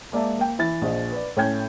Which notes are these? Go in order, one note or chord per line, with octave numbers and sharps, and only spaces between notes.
G#3 A#3 D5 E5 A5
A#3 G5
E3 E4 A6
A#1 F3 D#5
B4 D5
A2 C#4 A4 G5 G6 G#6